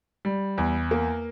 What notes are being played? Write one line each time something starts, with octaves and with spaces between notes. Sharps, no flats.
G3
E2
A#3